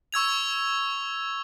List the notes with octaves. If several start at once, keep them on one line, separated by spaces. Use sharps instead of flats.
C#6 E6 G#6 F7